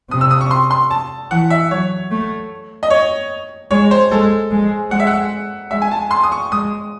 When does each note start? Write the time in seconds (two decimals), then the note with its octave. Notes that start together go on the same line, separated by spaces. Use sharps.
0.11 C3 D#6
0.21 E6
0.31 D#6
0.41 C#6
0.51 C6
0.71 C6
0.91 A5
1.31 E3 F#5
1.50 E5
1.71 F#3 C#5
2.11 A3
2.83 D#5
2.90 C#5
3.71 G#3 C#5
3.91 C5
4.11 G#3 A4
4.51 G#3
4.91 G#3 F#5
5.00 E5
5.07 F#5
5.71 G#3 E5
5.82 G#5
5.91 A5
6.11 C6
6.23 D#6
6.32 C#6
6.51 G#3 D#6